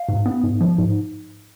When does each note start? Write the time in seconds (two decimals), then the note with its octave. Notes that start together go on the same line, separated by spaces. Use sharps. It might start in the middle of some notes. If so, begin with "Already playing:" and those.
Already playing: F5
0.09 G#2
0.26 B3
0.43 G#2
0.61 F3
0.78 G#2